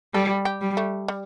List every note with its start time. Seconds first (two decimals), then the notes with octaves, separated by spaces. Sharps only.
0.14 G3 A4
0.45 G4
0.61 G3
0.77 A3
1.08 G3